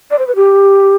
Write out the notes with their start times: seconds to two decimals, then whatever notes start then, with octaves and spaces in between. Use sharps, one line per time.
0.11 D5
0.19 C5
0.27 B4
0.36 G4